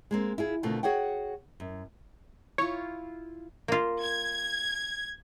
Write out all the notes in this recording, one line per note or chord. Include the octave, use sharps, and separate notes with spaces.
G#3 A#3 C4
E4 F4 G#4
B2 D3 D#3 A3 C4 F4
F#4 G#4 C#5 F#5 G5
F#2
E4 F4 C#5
A#3 F4
G#6